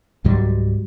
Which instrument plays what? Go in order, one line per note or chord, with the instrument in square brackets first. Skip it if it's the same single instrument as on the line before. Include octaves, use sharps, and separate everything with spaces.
[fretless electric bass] C#2 G#2 F#3 G3